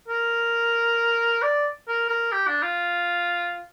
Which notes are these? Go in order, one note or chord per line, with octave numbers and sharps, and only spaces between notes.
A#4
D5
A#4
A#4
G4
D4
F4